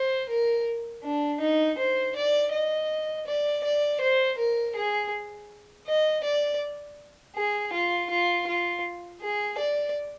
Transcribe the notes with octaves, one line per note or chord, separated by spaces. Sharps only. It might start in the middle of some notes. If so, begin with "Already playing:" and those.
Already playing: C5
A#4
D4
D#4
C5
D5
D#5
D5
D5
C5
A#4
G#4
D#5
D5
G#4
F4
F4
F4
G#4
D5